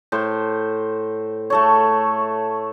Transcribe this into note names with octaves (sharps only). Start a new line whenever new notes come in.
A2 C5
A3 A4 C#5